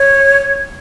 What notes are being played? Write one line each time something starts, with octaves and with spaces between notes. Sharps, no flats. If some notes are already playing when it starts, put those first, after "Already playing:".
Already playing: C#5